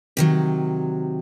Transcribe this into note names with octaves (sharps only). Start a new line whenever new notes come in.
C3 D#3 F#3